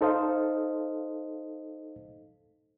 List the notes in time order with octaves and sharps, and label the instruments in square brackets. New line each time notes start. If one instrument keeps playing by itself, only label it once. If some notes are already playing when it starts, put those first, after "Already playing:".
[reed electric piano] D#4 A4 C5 D#5 F5